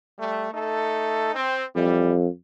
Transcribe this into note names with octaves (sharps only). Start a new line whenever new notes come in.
G3 A3
A3 D#4 A4
C4
F2 E3 G3